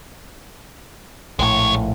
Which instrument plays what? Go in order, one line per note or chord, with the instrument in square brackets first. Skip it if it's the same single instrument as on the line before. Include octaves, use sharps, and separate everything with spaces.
[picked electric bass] A#1 A2 [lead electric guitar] G#3 C#5